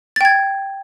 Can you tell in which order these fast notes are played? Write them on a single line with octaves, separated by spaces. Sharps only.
A6 G5 G#6